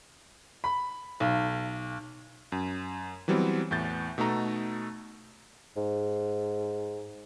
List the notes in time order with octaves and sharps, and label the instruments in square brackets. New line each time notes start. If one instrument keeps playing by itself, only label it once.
[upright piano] B5
B1
[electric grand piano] F#2
E3 F#3 G3 B3 C4
E2 A2 G6 A6
B2 A3 D#4 A4 A#5
[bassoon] G#2